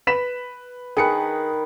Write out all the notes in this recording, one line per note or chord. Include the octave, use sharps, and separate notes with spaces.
B4 B6 E7
D#3 G#4 B4 C#7